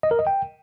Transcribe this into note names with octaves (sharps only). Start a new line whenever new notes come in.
D#5
A#4
D#5
G5